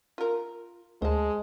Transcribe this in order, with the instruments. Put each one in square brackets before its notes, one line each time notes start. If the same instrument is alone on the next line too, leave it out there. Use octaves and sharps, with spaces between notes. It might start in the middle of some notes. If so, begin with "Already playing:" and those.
[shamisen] F4 A#4
[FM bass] D2 [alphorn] G#3 [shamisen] C5 A5